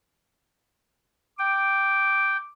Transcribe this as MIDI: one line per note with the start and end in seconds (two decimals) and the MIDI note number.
1.39 2.37 79
1.39 2.52 86